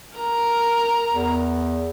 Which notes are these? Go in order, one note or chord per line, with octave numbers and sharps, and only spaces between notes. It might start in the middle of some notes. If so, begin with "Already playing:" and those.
A#4 A#5
E2